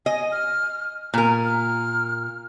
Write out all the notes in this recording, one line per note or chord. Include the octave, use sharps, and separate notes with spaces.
D#5 G#5
F6
A#2 A#4 G#5
F6